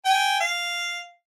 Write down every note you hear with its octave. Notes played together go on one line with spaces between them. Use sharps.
G5 G#5
F5